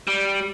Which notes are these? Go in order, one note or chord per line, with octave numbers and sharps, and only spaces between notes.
G3